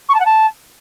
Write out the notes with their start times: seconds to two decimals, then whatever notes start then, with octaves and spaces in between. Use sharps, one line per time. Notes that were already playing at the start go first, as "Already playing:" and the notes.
0.09 C#6
0.14 A5
0.20 F#5
0.25 A5